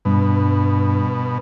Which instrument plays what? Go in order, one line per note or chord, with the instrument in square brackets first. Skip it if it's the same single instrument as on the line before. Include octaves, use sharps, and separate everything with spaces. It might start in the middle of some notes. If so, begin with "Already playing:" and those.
[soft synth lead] G2 [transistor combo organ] B2